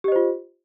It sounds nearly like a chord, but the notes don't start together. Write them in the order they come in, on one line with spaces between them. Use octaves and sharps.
G4 D#5 C5 F4